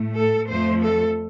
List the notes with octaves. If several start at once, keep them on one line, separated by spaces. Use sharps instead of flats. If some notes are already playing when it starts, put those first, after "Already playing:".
Already playing: A2 A3
A4
F2 F3 A3 C5
A4